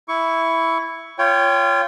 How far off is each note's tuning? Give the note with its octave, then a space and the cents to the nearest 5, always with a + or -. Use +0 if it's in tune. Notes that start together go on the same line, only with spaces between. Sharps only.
E4 +0 C#6 +15
F4 -25 C#5 +10 G5 +0